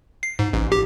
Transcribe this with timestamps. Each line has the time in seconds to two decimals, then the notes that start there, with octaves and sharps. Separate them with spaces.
0.23 C7
0.39 G#2
0.53 A1
0.72 G4